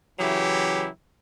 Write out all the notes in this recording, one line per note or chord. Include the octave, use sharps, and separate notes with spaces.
C#3 E3 F#3 E4 G4